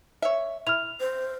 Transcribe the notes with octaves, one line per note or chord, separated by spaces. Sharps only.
C#5 E5
E4 F6 F7
C5